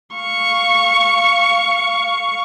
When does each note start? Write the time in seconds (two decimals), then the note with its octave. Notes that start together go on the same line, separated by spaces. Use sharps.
0.15 F5 C#6